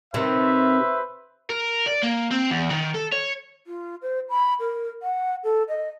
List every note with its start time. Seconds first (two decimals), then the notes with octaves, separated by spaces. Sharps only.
0.14 C3 D#3 B4 C5 E5
1.50 A#4
1.86 D5
2.03 A#3
2.31 C4
2.50 E2
2.71 D#3
2.95 A4
3.13 C#5
3.66 F4
4.02 C5
4.29 B5
4.60 A#4
5.02 F#5
5.44 A4
5.68 D#5